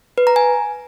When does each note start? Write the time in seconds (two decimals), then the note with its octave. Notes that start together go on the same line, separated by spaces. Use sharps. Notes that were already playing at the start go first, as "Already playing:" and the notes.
0.18 B4
0.27 A#5
0.36 G#5